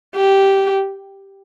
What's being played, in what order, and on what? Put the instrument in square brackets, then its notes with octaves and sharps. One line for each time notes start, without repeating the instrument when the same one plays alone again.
[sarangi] G4